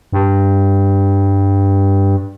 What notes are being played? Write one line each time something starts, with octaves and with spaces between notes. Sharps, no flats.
G2